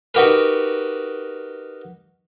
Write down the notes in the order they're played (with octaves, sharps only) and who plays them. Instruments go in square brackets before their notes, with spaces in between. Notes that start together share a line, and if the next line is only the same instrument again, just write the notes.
[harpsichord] D#4 F#4 G4 A#4 B4